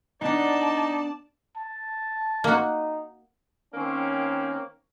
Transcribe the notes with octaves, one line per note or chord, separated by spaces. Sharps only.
B3 D4 D#4 D5 A5
A5
A#3 D#4 F#4
D#3 A#3 C4 C#4